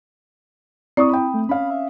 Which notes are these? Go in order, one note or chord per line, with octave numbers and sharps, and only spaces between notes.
C4 E4 D5 C#6 D#6
G5 B5
A3
C#4 F5 B5
E5